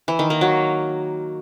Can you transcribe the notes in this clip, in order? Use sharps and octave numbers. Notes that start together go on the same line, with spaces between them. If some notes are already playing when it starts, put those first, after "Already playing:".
E3
D#3
A#3
F#3